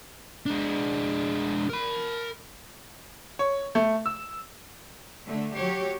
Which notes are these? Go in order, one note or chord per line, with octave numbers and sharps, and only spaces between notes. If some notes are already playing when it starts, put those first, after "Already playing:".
G#3 D4
A#4 B5
C#5
A3
E6
D3 A3
F#3 G4 C#5